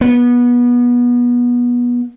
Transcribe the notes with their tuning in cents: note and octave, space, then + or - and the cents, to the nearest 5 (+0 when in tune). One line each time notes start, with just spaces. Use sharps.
B3 -25